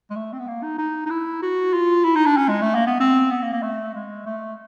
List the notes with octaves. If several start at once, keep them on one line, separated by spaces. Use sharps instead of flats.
G#3
A3
C4
B3
A#3
D#4
D#4
D#4
E4
F#4
F4
E4
D#4
D4
C#4
G#3
A3
A#3
B3
C4
B3
A#3
A#3
A3
G#3
A3